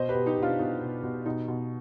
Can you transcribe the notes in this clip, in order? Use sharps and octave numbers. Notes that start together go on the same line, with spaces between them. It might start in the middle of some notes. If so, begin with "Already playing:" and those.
Already playing: B2 C5 D#5
G4 B4
B2
D#4 G4
B2 D4 F4
B2 D#4
B2
B2
B2 D#4
B2